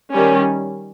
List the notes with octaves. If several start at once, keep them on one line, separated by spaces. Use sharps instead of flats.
D#3 G3 C#4